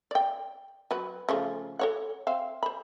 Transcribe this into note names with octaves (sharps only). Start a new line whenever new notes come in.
D5 G5
F#3 B4
C#3 F3 A3
A4 C#5 F#5
C4 E5 F5
C5 B5